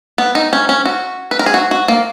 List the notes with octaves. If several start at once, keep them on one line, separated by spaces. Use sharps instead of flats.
B3
D#4
C#4
C#4
F#4
B4
A#4
G#4
F#4
F#4
A#3